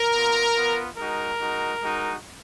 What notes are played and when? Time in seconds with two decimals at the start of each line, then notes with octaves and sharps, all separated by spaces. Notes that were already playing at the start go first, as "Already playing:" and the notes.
Already playing: A#4
0.13 B3 F4
0.55 B3 F4
0.98 G#3 D#4 F#4 A#4
1.39 G#3 D#4 F#4
1.80 G#3 D#4 F#4